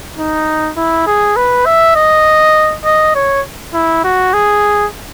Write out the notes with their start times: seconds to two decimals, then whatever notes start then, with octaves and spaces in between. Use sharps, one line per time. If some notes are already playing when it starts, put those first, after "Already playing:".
0.18 D#4
0.77 E4
1.07 G#4
1.36 B4
1.66 E5
1.96 D#5
2.85 D#5
3.15 C#5
3.74 E4
4.04 F#4
4.34 G#4